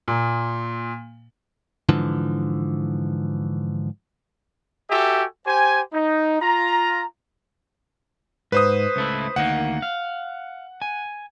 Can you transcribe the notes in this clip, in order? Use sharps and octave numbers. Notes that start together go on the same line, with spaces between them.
A#2
G#2 D3 E3 F3
F#4 G4 A4 E5 G#5
G4 C5 G#5
D#4
F4 A#5
G#2 B4 C5 D#6
C#2 A3 E4
D2 D#3 A#3 F#5
F5
G#5